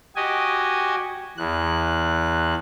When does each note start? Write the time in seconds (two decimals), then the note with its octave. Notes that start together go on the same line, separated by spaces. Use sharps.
0.16 F#4 G4 D#5 G#5
1.38 E2 F#6